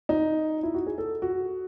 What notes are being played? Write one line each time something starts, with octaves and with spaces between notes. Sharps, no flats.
D#4
E4
F#4
G#4
A4
F#4